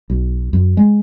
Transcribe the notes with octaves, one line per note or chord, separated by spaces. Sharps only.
B1
F#2
G#3